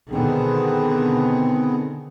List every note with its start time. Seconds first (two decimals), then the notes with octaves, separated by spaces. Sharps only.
0.11 B2 D3 D#3 B3 C4 G#4